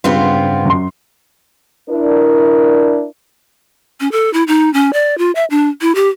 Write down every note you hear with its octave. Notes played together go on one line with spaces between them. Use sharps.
G2 C#3 B3 C4 F4
F#2 C6
D4 E4 A#4
C#4
A4
E4
D#4
C#4
D5
F4
E5
D4
E4
G4